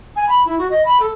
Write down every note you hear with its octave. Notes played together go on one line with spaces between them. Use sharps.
G#5
B5
E4
F#4
D#5
B5
A4